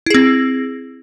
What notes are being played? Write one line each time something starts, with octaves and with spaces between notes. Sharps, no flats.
C4 E4 G#4